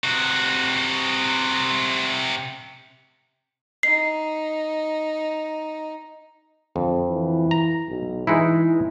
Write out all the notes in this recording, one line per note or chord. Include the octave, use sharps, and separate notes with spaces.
C3 F#4
D#4 C7
F2 D3
E3
A#5
B1
E3 G#3 D#4 E4